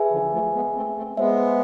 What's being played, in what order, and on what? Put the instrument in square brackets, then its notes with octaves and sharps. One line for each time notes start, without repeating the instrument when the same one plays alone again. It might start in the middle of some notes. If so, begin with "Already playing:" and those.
Already playing: [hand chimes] G#4 B4 E5 G#5
[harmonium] D3 F3
F3 A3
G#3 B3
A3 C4
A3 C4
[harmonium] G#3 B3 [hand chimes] G#4 C5 E5